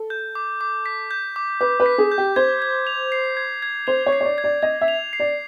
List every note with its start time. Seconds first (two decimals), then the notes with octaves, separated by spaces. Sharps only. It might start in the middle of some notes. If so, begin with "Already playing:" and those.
Already playing: A4
0.10 G6
0.35 D6
0.61 D6
0.86 B6
1.11 G6
1.36 D6
1.61 B4 D6
1.80 B4
1.86 B6
1.98 G#4
2.12 G6
2.18 G4
2.36 C5 G#6
2.62 G#6
2.87 F7
3.12 C7
3.37 G#6
3.62 G#6
3.87 C5 F7
4.06 C#5
4.13 C7
4.21 C#5
4.25 D5
4.38 G#6
4.44 D5
4.62 D#5 G#6
4.81 E5
4.88 F7
5.13 C7
5.20 D5